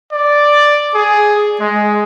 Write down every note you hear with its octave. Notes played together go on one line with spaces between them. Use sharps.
D5
G#4
G#3